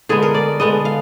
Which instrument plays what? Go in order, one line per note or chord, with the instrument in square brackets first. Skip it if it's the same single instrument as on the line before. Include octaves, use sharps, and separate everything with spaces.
[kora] D3 G#3 B3 G#4
A#4
D5
D3 G#3 B3 D#5
F5